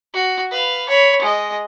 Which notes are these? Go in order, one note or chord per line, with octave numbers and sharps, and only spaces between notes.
F#4
B4 F5
C#5 B5
G#3 D#5